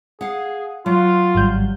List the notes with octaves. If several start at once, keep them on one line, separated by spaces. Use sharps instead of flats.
G#4 F5 F#5
F#3 F4
G#1 G3 G6